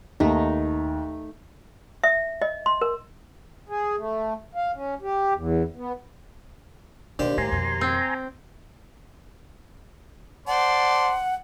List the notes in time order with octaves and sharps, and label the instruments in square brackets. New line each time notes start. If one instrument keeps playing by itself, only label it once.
[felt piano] D#2 [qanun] A3 D#4
[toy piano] E5
D#5
C6
A#4
[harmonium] G#4
A3
F5
C#4
G4
E2
B3
[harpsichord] D#2 G4 C5 [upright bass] B2 [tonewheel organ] D4
[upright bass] A2 [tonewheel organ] G#5 A#5 C6
[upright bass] F2 B2
[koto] C4
[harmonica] C5 D5 A5 [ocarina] F#5